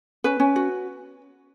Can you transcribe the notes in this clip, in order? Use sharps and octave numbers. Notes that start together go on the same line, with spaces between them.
C#4 B4
C#4
F#4